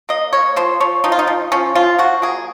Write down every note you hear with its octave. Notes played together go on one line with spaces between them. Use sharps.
A#3 D#5
A#3 C#5
F3 C5
F3 C#5
F3 D#4
F4
D#4
F3
F3 C#4
F3 F4
F3 F#4
A#3 G#4